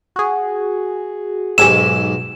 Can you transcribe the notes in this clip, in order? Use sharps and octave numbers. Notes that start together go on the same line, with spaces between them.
F#4 G#4
B1 G#2 G4 G#5 E6 E7